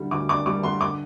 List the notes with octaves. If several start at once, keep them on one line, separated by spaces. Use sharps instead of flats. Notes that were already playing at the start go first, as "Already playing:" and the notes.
Already playing: D2 D3 G3 D4
D2 D6
D4 D6
G3 D6
D3 C6
D6